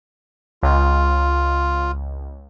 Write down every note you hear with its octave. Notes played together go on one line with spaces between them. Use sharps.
C#2 F4